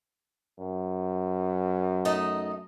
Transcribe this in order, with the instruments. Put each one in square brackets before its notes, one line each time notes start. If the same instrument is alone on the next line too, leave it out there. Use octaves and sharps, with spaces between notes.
[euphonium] F#2
[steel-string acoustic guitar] A3 D#4 D#5